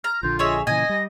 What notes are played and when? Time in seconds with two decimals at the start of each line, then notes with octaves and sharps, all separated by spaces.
0.04 A#5 F6
0.23 A#1 D3 F4 G6
0.39 G#4 C#5 D#5 E5
0.67 A#2 C#3 E3 D#5 G#5 A#6
0.89 G3